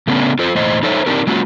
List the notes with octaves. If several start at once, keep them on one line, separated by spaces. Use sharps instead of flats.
C#3 A3 B3 C#4 D4
F4 A4 C5
E2 A2 C5 D#5
D#4 A4 C5 C#5 D#5 E5
C4 D4 D#4 G4 A#4
F#3 G#3 A#3 C#4 F4 F#4